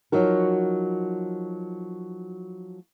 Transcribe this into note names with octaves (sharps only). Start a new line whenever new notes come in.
F3 F#3 D#4 F#4 A#4